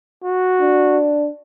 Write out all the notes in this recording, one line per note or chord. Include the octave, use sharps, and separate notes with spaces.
F#4
D4